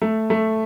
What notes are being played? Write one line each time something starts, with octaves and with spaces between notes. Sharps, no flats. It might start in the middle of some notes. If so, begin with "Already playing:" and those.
A3
A3